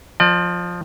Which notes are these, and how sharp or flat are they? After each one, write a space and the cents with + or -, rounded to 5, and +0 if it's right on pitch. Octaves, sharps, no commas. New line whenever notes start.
F3 +10 D5 +45